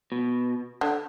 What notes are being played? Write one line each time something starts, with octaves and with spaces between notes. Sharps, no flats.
B2
D3